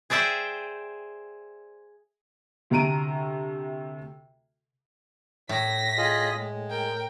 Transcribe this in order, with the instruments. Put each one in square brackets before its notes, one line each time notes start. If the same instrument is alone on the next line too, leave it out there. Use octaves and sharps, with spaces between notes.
[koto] G#4 C5 D5 E5 G5
[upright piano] D2 C3 A3 A#5 D7 D#7
[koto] A2 [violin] A#6 B6
[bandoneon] F4 G#4 D#5
G#3
[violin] A#4 G5